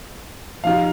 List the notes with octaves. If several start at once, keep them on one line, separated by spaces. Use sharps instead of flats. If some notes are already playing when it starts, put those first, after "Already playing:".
F3 D#4 G4 F5